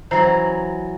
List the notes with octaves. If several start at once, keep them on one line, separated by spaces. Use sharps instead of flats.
E3 F#3 C5 A#5 C7